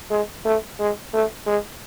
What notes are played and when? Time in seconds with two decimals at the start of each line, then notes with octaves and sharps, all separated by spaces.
0.11 G#3
0.45 A3
0.79 G#3
1.13 A3
1.46 G#3